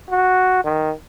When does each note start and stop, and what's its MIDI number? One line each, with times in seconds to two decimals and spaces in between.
0.10 0.63 66
0.64 0.92 51